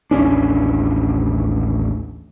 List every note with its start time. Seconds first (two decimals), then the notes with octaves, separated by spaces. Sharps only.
0.11 A1 D#2 C#4 D4